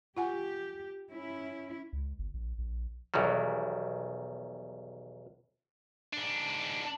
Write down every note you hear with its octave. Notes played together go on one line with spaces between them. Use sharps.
F4 G4 F#5 G#5
C#4 E4
C#2
G1
A#1
A#1
B1 E2 D#3 F#3 G3
G#2 D4